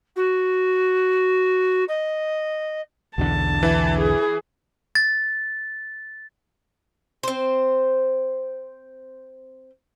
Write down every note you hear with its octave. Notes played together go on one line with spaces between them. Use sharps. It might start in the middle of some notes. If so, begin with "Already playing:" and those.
F#4
D#5
B1 E2 D3 A5
E3 E4
G#4
A6
C4 C5